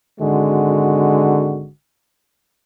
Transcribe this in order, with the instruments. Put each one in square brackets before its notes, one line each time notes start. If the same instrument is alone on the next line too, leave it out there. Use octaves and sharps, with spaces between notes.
[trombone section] G#1 D3 G#3 F#4